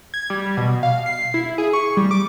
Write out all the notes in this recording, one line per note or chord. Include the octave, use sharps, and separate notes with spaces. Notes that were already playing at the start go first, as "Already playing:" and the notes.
G#6
G3
B2
F5
C7
E4
G#4
C#6
G3
D6